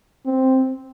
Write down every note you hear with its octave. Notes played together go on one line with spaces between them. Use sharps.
C4